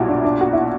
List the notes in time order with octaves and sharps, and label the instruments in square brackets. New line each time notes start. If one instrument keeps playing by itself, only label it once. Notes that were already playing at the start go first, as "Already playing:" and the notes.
Already playing: [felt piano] B1 A#2 G3 [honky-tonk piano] E4 F#4
[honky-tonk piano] D4
D4
F#4
E4